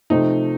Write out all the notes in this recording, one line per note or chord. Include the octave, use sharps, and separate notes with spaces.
C3 F3 A3 C4 D#4